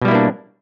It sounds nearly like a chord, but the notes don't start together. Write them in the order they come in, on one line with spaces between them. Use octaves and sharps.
B2 G3 E4 A#3 D4